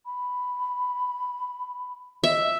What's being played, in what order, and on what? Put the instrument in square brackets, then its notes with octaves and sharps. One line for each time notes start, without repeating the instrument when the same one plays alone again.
[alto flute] B5
[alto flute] D#5 [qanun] E5